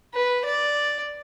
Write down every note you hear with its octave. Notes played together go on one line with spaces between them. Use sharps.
B4
D5